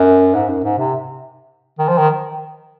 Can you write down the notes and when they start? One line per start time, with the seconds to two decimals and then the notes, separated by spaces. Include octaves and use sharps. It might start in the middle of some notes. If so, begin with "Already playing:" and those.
Already playing: F#2
0.35 G#2
0.49 F#2
0.64 G#2
0.78 C3
1.79 D#3
1.88 F3
1.98 D#3